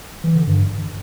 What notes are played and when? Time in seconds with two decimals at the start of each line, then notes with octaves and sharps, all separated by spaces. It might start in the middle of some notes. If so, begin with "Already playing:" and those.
0.24 E3
0.35 D3
0.47 G2